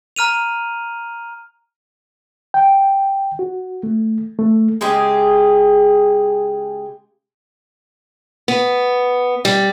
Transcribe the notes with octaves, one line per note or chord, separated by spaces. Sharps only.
A#5 F6 D#7 F7
G5
F#4
A3
A3
C#3 G#3 G4 G#4
B3
G3